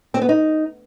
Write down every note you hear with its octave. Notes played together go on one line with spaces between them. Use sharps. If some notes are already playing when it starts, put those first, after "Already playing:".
C4
B3
D#4